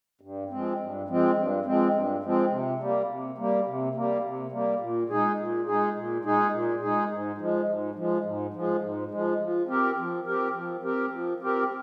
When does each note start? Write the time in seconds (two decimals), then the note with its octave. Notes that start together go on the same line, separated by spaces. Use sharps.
0.21 G2
0.50 F3 G#3 C4
0.79 G2
1.08 F3 G#3 C4
1.36 G2
1.65 F3 G#3 C4
1.93 G2
2.23 F3 G#3 C4
2.51 C3
2.80 G3 A#3
3.08 C3
3.38 G3 A#3
3.66 C3
3.95 G3 A#3
4.24 C3
4.51 G3 A#3
4.80 A#2
5.09 G#3 D#4 G#4
5.38 A#2
5.66 G#3 D#4 G#4
5.95 A#2
6.24 G#3 D#4 G#4
6.52 A#2
6.81 G#3 D#4 G#4
7.09 G#2
7.38 F3 G#3
7.68 G#2
7.95 F3 G#3
8.24 G#2
8.54 F3 G#3
8.81 G#2
9.11 F3 G#3
9.40 F3
9.67 C4 G4 A#4
9.97 F3
10.26 C4 G4 A#4
10.54 F3
10.83 C4 G4 A#4
11.11 F3
11.40 C4 G4 A#4